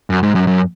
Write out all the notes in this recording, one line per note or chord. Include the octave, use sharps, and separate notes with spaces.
F#2
G#2
F#2
F#2